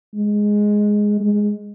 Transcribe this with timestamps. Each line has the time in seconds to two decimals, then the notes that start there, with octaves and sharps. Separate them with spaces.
0.14 G#3
1.20 G#3